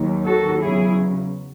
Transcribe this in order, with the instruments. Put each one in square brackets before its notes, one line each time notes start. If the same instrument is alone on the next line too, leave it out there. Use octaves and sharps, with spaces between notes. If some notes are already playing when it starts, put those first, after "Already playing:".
Already playing: [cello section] D#2 D#3 F#3
F#4 A4
E2 C#3 F#3 E4 G#4